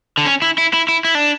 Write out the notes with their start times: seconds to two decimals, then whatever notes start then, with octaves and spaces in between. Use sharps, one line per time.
0.18 D3
0.26 C#4
0.42 E4
0.58 E4
0.73 E4
0.88 E4
1.05 E4
1.15 D4